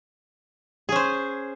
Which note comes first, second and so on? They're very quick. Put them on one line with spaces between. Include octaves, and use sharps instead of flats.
G#4 C#4 C5